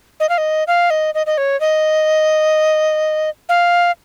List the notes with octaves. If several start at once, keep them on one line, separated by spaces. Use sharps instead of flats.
D#5
F5
D#5
F5
D#5
D#5
D#5
C#5
D#5
F5